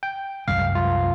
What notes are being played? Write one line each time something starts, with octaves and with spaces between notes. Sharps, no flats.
G5
C2 F#2 G#3 F5
F4